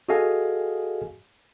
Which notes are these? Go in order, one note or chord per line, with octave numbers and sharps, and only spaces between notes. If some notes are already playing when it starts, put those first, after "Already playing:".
F#4 G#4 A4 D#5 F5 G#5